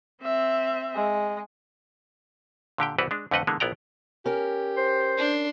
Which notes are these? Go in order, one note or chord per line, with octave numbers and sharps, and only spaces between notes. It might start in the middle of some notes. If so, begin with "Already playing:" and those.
C4 E5
G#3
A#2 D3 G4 G5
C2 E3 B3 F#4 G4 B4
G#3 D4
F2 D3 A3 B4 D#5 F#5
D3 E3 G#3 A#3 B3
A#1 B3 E4 D5 G5 A#5
C#4 G4 A#4
C5
D4 C6